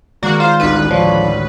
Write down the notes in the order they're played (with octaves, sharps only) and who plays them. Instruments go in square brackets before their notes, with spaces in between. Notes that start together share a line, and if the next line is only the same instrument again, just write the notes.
[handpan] D#3 G#3 D5 [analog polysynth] A#3 F#4 [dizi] A#5
[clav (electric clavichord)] F4 [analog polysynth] C5
[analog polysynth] A1 D2 B4 [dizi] D#4
[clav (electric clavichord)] F3 [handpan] C#5 [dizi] D5